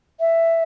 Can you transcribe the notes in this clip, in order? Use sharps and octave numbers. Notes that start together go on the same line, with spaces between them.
E5